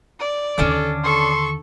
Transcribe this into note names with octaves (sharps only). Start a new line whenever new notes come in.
D5
D#2 D3 C#4 D4 A4 D6
A4 C6 C#6